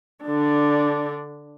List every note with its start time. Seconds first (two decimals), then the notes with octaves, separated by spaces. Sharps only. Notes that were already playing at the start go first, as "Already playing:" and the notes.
0.25 D3 D4